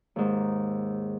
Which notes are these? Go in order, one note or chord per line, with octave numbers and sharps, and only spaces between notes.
D#2 G#2